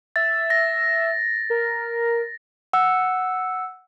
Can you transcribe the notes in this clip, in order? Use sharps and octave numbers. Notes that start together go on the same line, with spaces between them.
E5 A6
A#6
A#4
F#5 E6